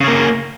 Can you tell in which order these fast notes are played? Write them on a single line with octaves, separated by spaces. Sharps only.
C#3 C#4 A#3